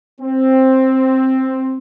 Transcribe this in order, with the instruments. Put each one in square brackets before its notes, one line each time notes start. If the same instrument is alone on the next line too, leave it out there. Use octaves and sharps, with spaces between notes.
[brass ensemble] C4